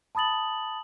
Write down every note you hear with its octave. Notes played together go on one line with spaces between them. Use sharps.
A5 B5 D#6 A6 F#7